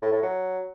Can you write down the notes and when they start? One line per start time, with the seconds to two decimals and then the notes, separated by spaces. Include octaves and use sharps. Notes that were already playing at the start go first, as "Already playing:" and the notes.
0.02 A2
0.12 A2
0.22 F#3